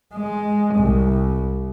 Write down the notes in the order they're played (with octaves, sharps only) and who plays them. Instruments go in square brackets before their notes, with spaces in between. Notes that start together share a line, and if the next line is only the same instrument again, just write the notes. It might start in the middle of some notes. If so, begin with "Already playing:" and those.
[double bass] G#3
C2